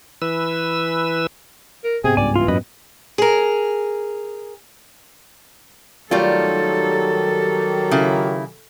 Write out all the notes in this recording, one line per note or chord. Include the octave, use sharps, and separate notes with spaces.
E3 B4 E6
A#4
G#2 C3 B3 G#4 G5
C#2 G2 D5 G#5
E3 F4
F#2 A#2 B4 D#5 B5
G#4 A#4
D#3 F#3 G3 A3 F4 G4 A4
C#3 E4